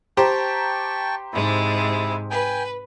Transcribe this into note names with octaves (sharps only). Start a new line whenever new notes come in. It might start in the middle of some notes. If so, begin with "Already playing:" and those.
G4 C5 G5 A5 A#5 C#6
G#2 C3 G#3 E4
B4 G5 G#5